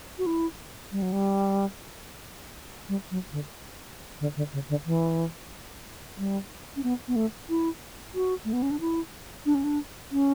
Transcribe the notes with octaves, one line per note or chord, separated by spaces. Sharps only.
F#4
E4
G3
F#3
G3
G3
F#3
D3
D3
D3
C#3
D3
E3
G3
C#4
B3
B3
A3
E4
F#4
A3
B3
C#4
D4
E4
D4
C#4
D4
C#4